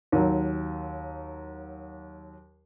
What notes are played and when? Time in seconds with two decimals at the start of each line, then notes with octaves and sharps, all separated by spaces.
0.12 D#2 F#3